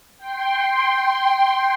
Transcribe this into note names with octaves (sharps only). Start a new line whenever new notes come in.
G5 C6